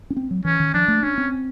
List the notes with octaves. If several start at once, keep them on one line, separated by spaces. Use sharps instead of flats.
C#4
C4
F#3
E3 C#4
D#3
F3 D4
A3
C#4 D4
C4